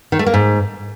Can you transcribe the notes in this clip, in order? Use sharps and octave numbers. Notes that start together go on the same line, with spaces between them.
D#3
A3
A#3
G#2